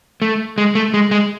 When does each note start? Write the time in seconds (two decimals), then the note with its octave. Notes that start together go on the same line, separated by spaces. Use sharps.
0.22 A3
0.58 G#3
0.75 A3
0.94 G#3
1.11 G#3